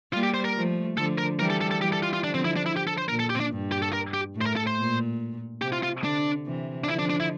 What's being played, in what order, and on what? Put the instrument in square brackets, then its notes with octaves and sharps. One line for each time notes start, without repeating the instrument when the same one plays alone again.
[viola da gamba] G3 A#3 [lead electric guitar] F4
[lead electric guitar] G4
C5
A#4
[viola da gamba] F3 A3
[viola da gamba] D3 F3 [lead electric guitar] A4
[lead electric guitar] A#4
[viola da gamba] E3 G3 [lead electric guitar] A#4
[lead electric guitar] A4
A4
A4
[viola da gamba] E3 G3 [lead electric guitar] G4
[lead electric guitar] A4
F4
F4
[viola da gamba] D3 F3 [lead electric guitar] D4
[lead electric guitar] C4
E4
D4
E4
G4
A4
C5
[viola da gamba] A#2 [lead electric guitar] A#4
[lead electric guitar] A4
G4
C4
D4
[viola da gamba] G2
[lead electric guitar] G4
A4
A#4
G4
[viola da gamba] A2
[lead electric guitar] C5
A#4
A4
C5
[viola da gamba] A#2
[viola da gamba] C3 [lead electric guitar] G4
[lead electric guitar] F4
F4
[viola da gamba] D3 [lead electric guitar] D4
[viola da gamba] C3 E3
[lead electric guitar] D4
[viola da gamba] D3 F3 [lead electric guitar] E4
[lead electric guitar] D4
D4
E4